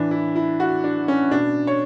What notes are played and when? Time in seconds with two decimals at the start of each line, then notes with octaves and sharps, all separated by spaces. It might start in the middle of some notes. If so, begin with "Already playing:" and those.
Already playing: A2 E3 D4
0.11 E4
0.36 E4
0.60 F#4
0.84 D4
1.08 C#4
1.31 B2 D4
1.67 C#5